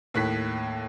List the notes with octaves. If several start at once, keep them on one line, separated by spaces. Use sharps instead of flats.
D#2 A2 F#6 B6